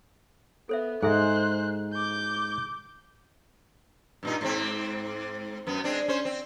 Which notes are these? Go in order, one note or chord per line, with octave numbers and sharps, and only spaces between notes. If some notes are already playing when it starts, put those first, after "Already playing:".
B3 A4 C5 E5
G#2 G#3 G#4 A4 C5 E5 F#6
D6 G6
G2 A#2 D#4
G#2 C4
F#2 B3
G#3 C4 D4
C#4 C5
C4